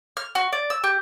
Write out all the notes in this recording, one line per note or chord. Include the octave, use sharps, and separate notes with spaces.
F6
F#4
D5
E6
G4